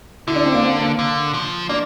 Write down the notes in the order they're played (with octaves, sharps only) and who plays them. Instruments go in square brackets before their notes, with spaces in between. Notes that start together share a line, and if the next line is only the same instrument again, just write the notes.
[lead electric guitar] D3 [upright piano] E4
[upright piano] D4
C4
A#3
C4
A#3
[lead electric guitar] D3
F3
[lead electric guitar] A#3 [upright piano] D4